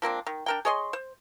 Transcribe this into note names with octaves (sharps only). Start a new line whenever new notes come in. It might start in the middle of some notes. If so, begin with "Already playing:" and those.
F3 A#3 C4 D4
D#3
D4 A#4 G5
G#4 C#5 D#5 C6
C5